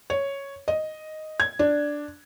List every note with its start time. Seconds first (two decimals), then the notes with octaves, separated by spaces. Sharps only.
0.10 C#5
0.68 D#5
1.40 G#6
1.59 D4